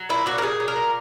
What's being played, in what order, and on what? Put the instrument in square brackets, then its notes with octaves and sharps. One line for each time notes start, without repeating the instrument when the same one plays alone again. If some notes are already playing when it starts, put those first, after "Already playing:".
Already playing: [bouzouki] F#3
A#2 E4
A#2 F#4
A#4
A#2 G#4
F#3
A#4
A#2